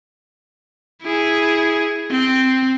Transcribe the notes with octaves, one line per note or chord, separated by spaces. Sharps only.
E4 G#4
C4